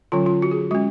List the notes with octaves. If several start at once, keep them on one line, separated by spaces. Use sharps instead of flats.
D3 F#3 C#4 F4
F4
F#4
G#4
G#3 C#4 F#4